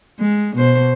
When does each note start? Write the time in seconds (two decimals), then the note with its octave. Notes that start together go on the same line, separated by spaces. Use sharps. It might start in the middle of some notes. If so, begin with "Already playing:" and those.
0.19 G#3
0.56 B2 C5